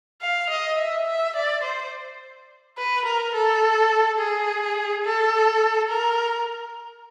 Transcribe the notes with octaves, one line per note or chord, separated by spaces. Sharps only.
F5
D#5
E5
E5
D5
C5
B4
A#4
A4
G#4
A4
A#4